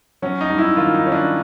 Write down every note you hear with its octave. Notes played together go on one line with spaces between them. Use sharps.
F#3 C#4
D#4
G2
E4
D#3 F4
D#4
D#3 C#4
D4